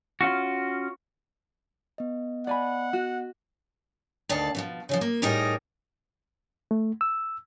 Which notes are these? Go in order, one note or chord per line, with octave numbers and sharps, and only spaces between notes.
C#4 F4 F#4
B3 D#5
D5 F#5 G#5 B5
F#4
D2 D#3 D5 F5 A5
B2 E3 F3
C#3 E3 F3
A#3
A2 G3 D#4 G#4 A#4 G5
A3
E6